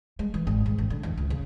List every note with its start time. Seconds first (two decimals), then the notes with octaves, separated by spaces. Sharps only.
0.19 G#3
0.34 E3
0.47 G#1
0.66 G#2
0.78 A1
0.90 D3
1.03 E2
1.17 C#2
1.30 C#3